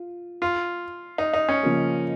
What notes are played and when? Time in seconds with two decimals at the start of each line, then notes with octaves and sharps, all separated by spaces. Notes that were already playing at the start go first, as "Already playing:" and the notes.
Already playing: F4
0.42 F4
1.18 D#4
1.34 D#4
1.49 C#4
1.63 C#3 F3 A#3